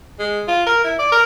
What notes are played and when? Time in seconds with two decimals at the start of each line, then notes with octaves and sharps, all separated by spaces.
0.19 G#3
0.48 F4
0.66 A#4
0.84 E4
0.99 D5
1.12 A#4